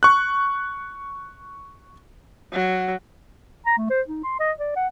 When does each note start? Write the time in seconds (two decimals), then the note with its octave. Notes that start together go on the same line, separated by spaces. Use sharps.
0.03 C#6 F#6
2.53 F#3
3.66 A#5
3.78 A3
3.90 C5
4.08 D#4
4.24 C6
4.40 D#5
4.60 D5
4.76 F#5